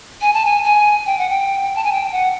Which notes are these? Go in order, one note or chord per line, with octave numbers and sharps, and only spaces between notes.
G#5
A5
G#5
G#5
G5
F#5
G5
A5
G#5
G5
F#5